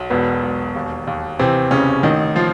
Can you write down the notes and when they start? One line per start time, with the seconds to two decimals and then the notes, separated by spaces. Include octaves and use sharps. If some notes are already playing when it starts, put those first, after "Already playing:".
Already playing: B1
0.10 E1 B2 B3
0.43 E1
0.75 D#2
1.07 D#2
1.39 C3 E3 C4
1.71 F#1 C#3 C#4
2.03 A1 D#3 D#4
2.36 F3 F4